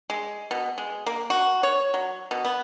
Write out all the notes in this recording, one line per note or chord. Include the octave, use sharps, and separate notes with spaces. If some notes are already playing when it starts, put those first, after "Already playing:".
G#3
B2
G#3
A#3
F#4
C#5
F#3
B2
B3